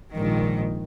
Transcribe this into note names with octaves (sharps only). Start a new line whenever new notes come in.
A#1 G#2 D#3